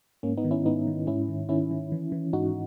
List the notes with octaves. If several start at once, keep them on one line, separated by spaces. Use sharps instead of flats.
G#2 A#3 C#4
B3 D#4
D#3
C#4 E4
G#2 B3 D#4
D#3
G#2 C#4 E4
D#3
D#3 C#4 E4
D#3
E3
E3
G#2 D#4 F#4